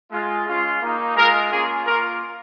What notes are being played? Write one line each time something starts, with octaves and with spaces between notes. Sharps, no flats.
G#3 F4
G#3 C#4 F4
A#3 D#4
G#3 F4 A#4
A#3 C#4 F4 G#4
A#3 F4 A#4